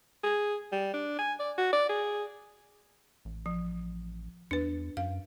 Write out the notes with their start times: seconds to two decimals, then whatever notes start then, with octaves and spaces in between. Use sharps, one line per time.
0.23 G#4
0.72 G3
0.94 D4
1.19 G#5
1.39 D5
1.58 F#4
1.73 D5
1.89 G#4
3.25 A1
3.46 F3
4.51 E2 D4 B4
4.97 F#2 F5